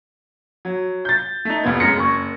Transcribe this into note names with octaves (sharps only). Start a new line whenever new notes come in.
F#3
G6 A6
A3 D#4
F1 A2 B3 G#6
F#2 G#3 A#6 C#7
F#1 C#6